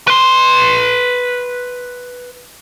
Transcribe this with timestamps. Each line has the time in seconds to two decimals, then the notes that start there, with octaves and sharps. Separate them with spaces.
0.07 B4 C6